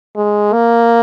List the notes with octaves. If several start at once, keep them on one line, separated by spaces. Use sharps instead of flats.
G#3
A#3